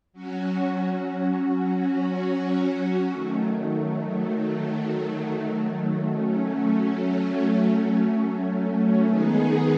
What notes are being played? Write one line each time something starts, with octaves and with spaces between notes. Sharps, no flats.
F#3 C#4 F#4
D#3 F#3 A3
F#3 A3 C#4
D#3 G#3 B3 D#4 G#4